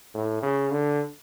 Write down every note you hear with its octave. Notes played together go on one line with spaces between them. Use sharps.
A2
C#3
D3